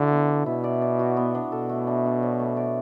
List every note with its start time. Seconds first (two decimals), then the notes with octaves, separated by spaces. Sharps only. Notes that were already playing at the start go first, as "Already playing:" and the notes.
Already playing: D3 E4 F#4 D5
0.11 B3
0.29 D4
0.46 B2 E4
0.64 D5
0.82 D5
0.99 F#4
1.17 B3
1.35 D4
1.52 B2 A4
1.69 A3
1.87 D4
2.05 D4
2.23 F#3
2.40 A3
2.57 D5